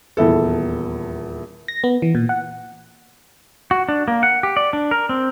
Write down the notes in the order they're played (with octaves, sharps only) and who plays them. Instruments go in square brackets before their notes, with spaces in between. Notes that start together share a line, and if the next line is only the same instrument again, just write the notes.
[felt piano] D#1 E2 E4 A4
[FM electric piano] A#6
B3
E3
A#2
F#5
[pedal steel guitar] F#4
D4
A#3
F#5
G4
D5
D4
A#4
C4